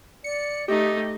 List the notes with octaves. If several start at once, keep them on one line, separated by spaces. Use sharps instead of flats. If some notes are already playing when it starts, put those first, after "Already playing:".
D5 C#7
A3 D#4 G4 D#5